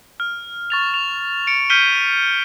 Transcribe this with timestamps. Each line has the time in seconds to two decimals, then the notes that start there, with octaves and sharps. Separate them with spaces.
0.20 F6
0.70 C#6 A6 F7
0.94 F7
1.47 C#7 D7
1.70 F6 G6 B6 C#7 D#7 G7